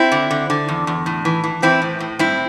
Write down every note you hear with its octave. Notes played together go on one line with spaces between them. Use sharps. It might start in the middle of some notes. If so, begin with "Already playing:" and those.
Already playing: C4 E4
D3
D3
D3
E2
E2
A2
E3
E3
E3 C4 E4
A2
A2
G2 C4 E4